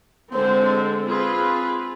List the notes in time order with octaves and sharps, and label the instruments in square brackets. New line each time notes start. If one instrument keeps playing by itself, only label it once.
[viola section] D3 G#3 C4 [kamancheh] C5
[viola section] C4 F4 G#4 B4